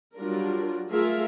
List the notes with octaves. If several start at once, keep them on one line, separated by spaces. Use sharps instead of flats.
F#3 G3 D4 F4 A#4
A3 F4 G#4 A#4 E5 F5